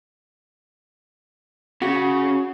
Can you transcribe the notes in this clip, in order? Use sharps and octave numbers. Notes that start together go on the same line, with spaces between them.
C#3 F#4